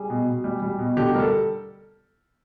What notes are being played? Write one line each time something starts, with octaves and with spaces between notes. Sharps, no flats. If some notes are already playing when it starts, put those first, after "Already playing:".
Already playing: G3 G#4
B2
B2
G3
G3
B2
D3 G4
G3 A#4
A4